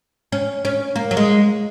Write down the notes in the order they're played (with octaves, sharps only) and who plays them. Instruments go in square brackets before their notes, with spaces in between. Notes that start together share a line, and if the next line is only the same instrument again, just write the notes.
[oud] C#4
C#4
A#3
F#3
G#3